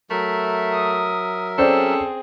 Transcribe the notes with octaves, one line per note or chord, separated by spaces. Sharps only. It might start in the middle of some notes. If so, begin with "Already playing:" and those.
F#3 A3 A#4 E5
D#6
C4 C#4 G#4 A4 C5 D5